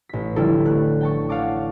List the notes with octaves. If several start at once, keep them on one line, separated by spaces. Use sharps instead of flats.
A1 B6
D3 F3 G3 E4 A4
A3 F#6
G5 A5 C#6
C#5 F5 F#5 A5 D6